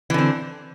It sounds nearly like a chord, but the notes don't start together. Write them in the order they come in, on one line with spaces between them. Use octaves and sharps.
E3 D3 C4